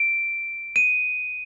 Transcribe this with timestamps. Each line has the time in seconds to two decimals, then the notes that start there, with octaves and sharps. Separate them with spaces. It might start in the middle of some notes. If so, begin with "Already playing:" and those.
Already playing: D7
0.76 D#7